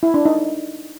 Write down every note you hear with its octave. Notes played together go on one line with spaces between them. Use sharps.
E4
D4
D#4